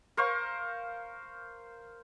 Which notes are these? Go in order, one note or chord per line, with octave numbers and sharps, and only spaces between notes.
A#4 C5 F5 C#6